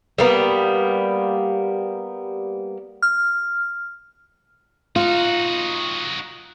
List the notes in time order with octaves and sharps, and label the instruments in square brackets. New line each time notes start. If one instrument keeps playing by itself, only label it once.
[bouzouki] G3 A#3 B3
[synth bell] F6
[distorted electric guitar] D#4 F#4 [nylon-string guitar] F4